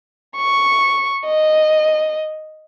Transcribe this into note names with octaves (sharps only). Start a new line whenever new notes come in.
C#6
D#5